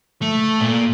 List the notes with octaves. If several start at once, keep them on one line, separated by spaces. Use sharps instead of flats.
A3
A#2